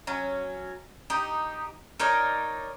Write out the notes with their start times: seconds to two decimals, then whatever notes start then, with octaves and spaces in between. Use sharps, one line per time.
0.07 F#3 C#4
1.10 D#4 G4
1.99 D#4 A#4 C#5 D5